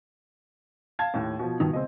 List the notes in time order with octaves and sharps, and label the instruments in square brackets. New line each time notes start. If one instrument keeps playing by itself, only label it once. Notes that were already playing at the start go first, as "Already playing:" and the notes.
[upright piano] F5 A5 G#6
D#2 A2
B2 F3
[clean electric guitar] G2 D#3 D#4
[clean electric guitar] C#2 [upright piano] C4 D#5